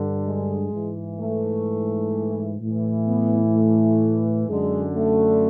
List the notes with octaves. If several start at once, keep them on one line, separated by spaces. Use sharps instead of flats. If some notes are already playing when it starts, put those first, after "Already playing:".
Already playing: G2 D3
G#3
G#2 E3
A3
A2 E3
B3
A3
F#2 D3 G#3
A3